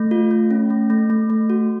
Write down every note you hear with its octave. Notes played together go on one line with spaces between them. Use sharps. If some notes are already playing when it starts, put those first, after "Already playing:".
Already playing: A3
F4
A3
C#4
A3
A3
A3
A3
F#4